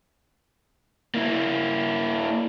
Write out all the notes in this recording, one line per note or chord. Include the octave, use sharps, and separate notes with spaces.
A#3 E4